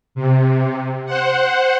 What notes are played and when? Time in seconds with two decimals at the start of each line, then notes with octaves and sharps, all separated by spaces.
0.15 C3
1.06 C5 F#5